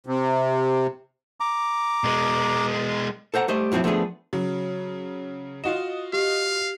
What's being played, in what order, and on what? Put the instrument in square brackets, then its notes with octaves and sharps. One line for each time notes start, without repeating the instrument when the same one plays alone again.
[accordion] C3
[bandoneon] A#5 D6
[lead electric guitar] B2 G#3
[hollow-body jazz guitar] A4 C5 F#5 A#5
G3 A3 C5 D#5
F#2 F3 F#3 C4 E4
F3 A3 B3 D4 G#4
[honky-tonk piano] C#3 F#3
[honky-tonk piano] F4 F#4 D#5 [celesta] E7
[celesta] G4 [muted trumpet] F5